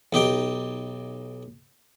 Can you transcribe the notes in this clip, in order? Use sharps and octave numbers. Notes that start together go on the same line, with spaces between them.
B1 D#4 G4 G5